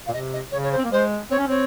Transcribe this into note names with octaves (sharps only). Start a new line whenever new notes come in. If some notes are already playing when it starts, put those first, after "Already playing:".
A#2 F5
C3 D#5
D#5
C#3 C#5
C#5
C5
C4
A#3
G#3 C5
C4 C#5
C#4
C4 C#5